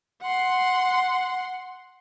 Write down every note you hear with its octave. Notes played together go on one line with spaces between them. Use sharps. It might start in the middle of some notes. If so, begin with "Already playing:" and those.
F#5 C6